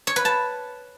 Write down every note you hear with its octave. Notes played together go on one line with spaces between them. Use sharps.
C#5
B4
A5